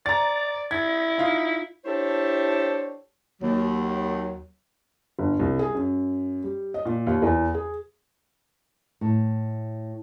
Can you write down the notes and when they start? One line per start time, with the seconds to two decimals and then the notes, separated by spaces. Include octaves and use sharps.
0.06 D5 A#5 A6
0.71 E4 G#6
1.18 D#4 F4
1.85 D4 E4 G4 A4 C5 C#5
3.42 D#2 F#3
5.19 G1
5.39 C2
5.59 G#4
5.75 F#2
6.44 G3
6.74 D#5
6.85 A#2
7.07 D#2
7.22 E2
7.54 G#4
9.01 A2